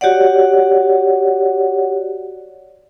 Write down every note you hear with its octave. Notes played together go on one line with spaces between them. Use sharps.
F#4 G4 C#5 D5 F#5